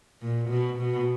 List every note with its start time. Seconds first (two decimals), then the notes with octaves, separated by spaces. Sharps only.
0.21 A#2
0.49 B2
0.78 B2